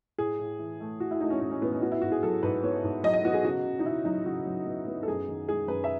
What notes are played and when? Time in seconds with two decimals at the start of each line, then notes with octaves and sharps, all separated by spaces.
0.18 A2 G#4
0.39 A2
0.59 E3
0.80 A3
1.00 A2 F#4
1.11 E4
1.21 A3 D#4
1.30 C#4
1.41 A2 C#4
1.51 C#4
1.61 A2 B3
1.72 C#4
1.82 B3 F#4
1.92 E4
2.02 G#2 F#4
2.12 G#4
2.23 F#3 A4
2.43 G#2 B4
2.63 B3 C#5
2.84 G#2
3.03 F#3 D#5
3.14 D#5
3.24 B3 F#4
3.34 G#4
3.44 C#3 F#4
3.65 C#3
3.79 D#4
3.85 C#3 E4
4.05 F#3 D#4
4.25 C#3 F#4
4.47 F#3
4.66 B3
4.87 B3
5.03 A4
5.08 F#2 G#4
5.28 D#3
5.48 G#3 G#4
5.68 F#2 B4
5.84 E5